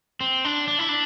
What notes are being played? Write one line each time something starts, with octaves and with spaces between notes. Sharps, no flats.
C4
D4
D4
E4
D4